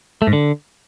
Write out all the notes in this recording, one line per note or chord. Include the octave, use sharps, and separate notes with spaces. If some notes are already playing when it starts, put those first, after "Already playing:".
A3
G#2
D3